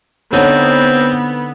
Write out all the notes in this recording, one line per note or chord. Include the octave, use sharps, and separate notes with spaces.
D3 B3 C4 D#4 C5 C#5